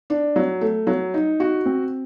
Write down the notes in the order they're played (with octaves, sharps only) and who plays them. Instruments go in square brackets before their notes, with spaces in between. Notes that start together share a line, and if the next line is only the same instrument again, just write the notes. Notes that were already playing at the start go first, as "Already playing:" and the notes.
[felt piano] D4
F#3
A3
F#3
D#4
F#4
C4